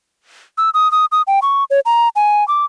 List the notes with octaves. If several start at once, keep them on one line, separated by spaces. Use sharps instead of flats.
E6
D#6
D#6
D#6
G5
C#6
C#5
A#5
G#5
D6